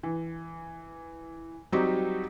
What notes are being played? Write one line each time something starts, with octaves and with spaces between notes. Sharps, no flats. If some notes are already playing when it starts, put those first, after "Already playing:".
E3
F#3 G3 C4 D#4 F#4 G4